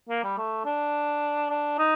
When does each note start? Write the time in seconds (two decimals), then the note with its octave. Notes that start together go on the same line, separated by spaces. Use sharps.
0.09 A#3
0.24 G3
0.38 A3
0.66 D4
1.50 D4
1.79 D#4